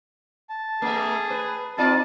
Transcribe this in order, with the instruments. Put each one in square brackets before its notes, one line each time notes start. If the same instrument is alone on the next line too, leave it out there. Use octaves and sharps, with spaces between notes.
[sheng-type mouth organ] A5
[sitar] A3 E5 [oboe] G#4
[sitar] B4
[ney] C4 [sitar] D#4 F4 D5 [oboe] A5